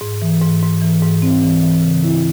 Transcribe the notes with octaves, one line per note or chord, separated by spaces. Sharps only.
G#2
E3
G#2
G#2
E3
G#2
C4
E3
E3
C#3
E4